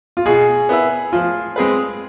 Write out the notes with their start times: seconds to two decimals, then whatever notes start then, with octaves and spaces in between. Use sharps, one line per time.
0.17 F4
0.26 B2 G#4
0.69 B3 E4 B4 E5
1.13 F3 F4
1.56 G#3 C4 G#4 B4